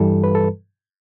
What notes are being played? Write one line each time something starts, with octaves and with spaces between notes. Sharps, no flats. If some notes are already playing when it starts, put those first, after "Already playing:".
Already playing: G2 E3 G3 A4
B4
A4